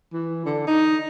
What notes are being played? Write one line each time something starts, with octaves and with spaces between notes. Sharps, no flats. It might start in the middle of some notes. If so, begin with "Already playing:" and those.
E3
D3
D#4